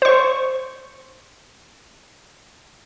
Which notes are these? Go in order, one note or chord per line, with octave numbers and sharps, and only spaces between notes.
C5 C#6